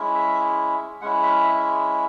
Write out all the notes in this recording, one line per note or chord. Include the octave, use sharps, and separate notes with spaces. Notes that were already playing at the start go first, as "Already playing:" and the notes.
Already playing: G#3 C#4 E4
E5
G#3 C#4 E4 F#5
E5
E5